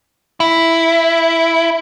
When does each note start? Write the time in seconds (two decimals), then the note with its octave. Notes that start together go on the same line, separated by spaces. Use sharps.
0.40 E4